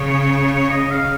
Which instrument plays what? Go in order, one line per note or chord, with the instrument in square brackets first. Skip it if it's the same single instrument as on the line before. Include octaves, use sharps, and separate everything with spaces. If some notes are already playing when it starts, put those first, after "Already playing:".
Already playing: [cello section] C#3 [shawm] C#5
[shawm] D#5
F5